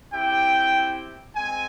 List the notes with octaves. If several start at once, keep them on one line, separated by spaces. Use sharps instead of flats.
C4 E4 G4 G5
G#3 C4 G#5